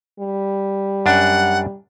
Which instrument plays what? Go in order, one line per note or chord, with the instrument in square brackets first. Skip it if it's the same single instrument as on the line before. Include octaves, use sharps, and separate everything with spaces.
[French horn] G3
[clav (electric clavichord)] F#2 D4 [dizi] F#5